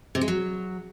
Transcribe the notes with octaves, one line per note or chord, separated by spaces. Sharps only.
C3
G#3
F#3